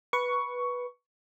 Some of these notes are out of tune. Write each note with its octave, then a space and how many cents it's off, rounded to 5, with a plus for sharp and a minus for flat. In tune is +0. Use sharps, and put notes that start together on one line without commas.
B4 -10 C#6 +10